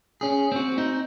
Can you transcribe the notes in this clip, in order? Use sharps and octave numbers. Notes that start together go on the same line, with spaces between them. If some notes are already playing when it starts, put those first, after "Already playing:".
C#4 G#4
C4 F#4
C4 D#4